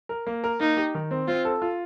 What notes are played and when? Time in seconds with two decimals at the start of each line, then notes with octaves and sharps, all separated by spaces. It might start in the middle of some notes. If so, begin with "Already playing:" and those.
0.09 A#4
0.27 A#3
0.44 A#4
0.60 A#3 D#4
0.77 G4
0.95 D#3
1.11 C4
1.28 C4 F4
1.45 A4
1.62 F4